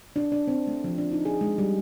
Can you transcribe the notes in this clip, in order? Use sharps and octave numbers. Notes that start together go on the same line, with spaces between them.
D4
D4
C4
A3
F3
D4
D#4
G#4
G#3
G3